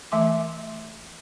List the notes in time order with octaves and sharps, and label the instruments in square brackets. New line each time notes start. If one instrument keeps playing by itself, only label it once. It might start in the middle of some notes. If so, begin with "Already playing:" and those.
[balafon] E3 A3 E5 G#5 C6 D6